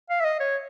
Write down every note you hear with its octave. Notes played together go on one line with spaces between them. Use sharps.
F5
E5
D#5
C#5